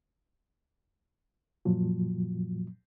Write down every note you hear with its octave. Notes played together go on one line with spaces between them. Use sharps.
F#2 A#2 F3 F#3